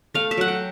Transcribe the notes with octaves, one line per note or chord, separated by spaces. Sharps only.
A3 F5
E5
F#3 F#5
G5